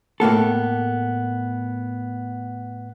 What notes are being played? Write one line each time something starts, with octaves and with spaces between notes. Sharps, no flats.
A2 A#3 B3 A4